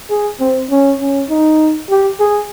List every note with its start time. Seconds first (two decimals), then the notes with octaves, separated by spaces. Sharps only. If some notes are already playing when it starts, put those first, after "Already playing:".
0.10 G#4
0.40 C4
0.70 C#4
1.00 C#4
1.30 D#4
1.90 G4
2.20 G#4